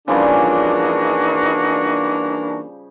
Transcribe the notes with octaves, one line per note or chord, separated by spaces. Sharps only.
C#3 E3 F3 G3 A#3 D4 D#4 F#4